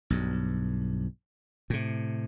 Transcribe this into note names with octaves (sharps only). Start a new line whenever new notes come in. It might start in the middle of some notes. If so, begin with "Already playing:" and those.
B1 G2
A2 C3